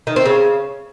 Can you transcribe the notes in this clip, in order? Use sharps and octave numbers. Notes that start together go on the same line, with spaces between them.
D#3
C4
C#3